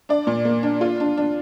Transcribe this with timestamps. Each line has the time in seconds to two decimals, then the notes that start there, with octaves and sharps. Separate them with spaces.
0.09 D4 D5
0.27 A#2
0.45 A#3
0.63 D4
0.81 F4
1.00 D4
1.18 D4